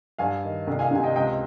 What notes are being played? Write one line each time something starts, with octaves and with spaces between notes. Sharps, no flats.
G2 F5 G#5
D#3
C2
F5 G#5
C3 G#5
D#5 G5
C#2 D#5 G5